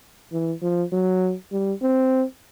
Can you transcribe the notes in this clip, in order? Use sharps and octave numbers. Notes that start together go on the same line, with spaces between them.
E3
F3
F#3
G3
C4